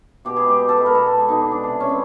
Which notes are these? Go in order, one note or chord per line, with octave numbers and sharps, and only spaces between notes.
B2 G4
G#4
G#3
G4
B2
A4
G#3 B4
A#4
B2 A4
A4
G#3
G#4
B2 D#4
D4
G#3
D4
C3 D4
E3 G#3 C#4
C4